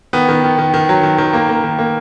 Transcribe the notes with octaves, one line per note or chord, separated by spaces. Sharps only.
D#3 B3
D#3
D#3
D#3
D#3
F#3
D#3
D#3
A#3
A#3
D#3
A#3